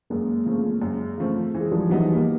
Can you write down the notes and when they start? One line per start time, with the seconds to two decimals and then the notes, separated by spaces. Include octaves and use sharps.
0.10 F#2 G#3 A#3
0.46 C#3 F3 A3 C4
0.82 F#2
1.18 C#3 F3 A3 C4
1.54 E3
1.61 G#3
1.72 F3 G3
1.89 E3 F#3 G3 B3 D#4
2.14 A#3